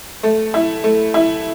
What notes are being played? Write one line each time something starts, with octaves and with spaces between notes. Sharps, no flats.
A3
E4
A3
E4